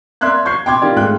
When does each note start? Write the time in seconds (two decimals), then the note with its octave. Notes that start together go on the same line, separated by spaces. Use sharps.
0.21 A#4 D5 E5 C6 F#6 G#6
0.45 C#6 G6 G#6 C7
0.66 G5 C6 D6 G#6
0.82 D#3 F4 G4 D5
0.96 G#2 G#3 A3 F4 G5 F#6